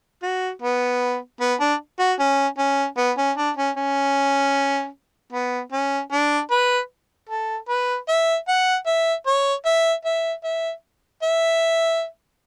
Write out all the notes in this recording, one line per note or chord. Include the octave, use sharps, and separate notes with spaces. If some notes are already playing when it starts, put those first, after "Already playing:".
F#4
B3
B3
D4
F#4
C#4
C#4
B3
C#4
D4
C#4
C#4
B3
C#4
D4
B4
A4
B4
E5
F#5
E5
C#5
E5
E5
E5
E5